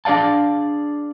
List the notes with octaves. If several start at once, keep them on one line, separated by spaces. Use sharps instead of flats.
D4 G#4 D5 F5 A5